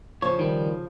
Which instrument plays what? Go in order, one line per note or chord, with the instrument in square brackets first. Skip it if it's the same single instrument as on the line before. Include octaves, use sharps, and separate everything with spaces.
[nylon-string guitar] C#3 F3 [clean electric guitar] C#5
[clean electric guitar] D#3 G3